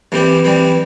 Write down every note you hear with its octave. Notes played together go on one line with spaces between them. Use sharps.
G2 E3 G3 C4 G4
G2 E3 G3 C4 G4